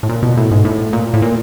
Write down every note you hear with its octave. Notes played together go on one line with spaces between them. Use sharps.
A2
A#2
B2
A2
G#2
A2
A#2
A2
A#2